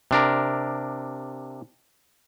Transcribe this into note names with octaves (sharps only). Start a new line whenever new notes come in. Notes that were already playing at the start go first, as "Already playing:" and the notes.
C3 D4 A#4